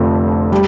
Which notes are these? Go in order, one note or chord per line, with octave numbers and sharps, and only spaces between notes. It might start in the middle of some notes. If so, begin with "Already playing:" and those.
Already playing: F1 F2 D3 C4
G3